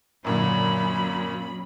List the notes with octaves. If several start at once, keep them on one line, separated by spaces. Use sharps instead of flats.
F#2 A#2 D3 F#3 C#4 B5